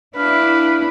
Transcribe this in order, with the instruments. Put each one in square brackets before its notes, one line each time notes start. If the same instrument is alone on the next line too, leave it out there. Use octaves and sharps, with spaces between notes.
[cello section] D4 E4 [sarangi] B4 [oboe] F5